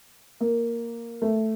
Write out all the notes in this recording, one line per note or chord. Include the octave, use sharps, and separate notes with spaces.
A#3
A3